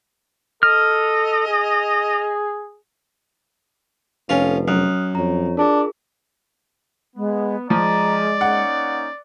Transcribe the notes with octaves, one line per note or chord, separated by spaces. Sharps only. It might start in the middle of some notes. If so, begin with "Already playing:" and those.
A4 D#5 F6
G#4
F1 C#4 F4 A4 B4
F#2 D#6 F6 F#6
F2 C#5 A#5
D4 F4 G#4 A#4
G#3 B3
F3 G#3 D5 A#5
A#3 C#4 D#4 F#5